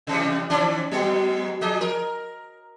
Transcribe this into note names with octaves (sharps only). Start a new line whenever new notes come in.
C3 E3 G3
D#3 C#4 D5
F#3 G#3 B3
F3 G#4 D#5
A#4